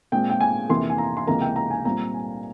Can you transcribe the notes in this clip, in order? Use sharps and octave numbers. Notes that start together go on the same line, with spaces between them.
A#2 G#3 C4 G5
G5
G#5
F2 C3 E3 A#3 C6
G#5
A#5
C6
C#2 C3 E3 A#3 A#5
G5
A#5
G#5
A#2 G3 C4 A#5
G#5